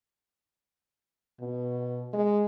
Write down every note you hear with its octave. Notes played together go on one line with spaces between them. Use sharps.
B2
G#3